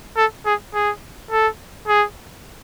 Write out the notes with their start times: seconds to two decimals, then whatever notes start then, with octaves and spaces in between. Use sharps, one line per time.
0.17 A4
0.46 G#4
0.74 G#4
1.31 A4
1.88 G#4